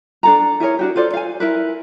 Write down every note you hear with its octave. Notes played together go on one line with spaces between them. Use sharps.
D4 A4 A#5
E4 G#4 A#4 C#5
D4 F#4 G4
F4 A4 C5 D5
F5 G#5
E4 A#4 B4